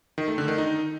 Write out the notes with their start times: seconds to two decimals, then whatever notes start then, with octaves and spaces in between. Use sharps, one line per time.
0.18 D#3
0.28 A3
0.38 D3
0.48 D#3
0.58 D#4